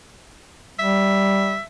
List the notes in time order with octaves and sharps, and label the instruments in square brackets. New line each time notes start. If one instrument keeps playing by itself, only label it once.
[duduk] G3 [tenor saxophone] E5